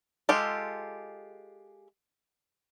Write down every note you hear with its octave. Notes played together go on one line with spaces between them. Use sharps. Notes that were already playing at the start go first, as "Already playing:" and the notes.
G#3 F4 G4 A4